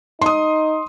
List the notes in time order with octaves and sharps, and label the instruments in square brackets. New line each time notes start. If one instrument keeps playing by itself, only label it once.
[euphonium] D#4 [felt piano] C6 D#6